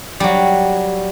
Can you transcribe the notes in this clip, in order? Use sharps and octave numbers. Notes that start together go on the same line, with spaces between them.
F#3 G3